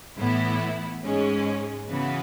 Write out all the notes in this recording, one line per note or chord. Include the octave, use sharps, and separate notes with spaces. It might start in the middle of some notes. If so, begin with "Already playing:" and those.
A2 E3 B3 E4
G#2 G#3 C#4
C#3 E3 B3 F#4 B4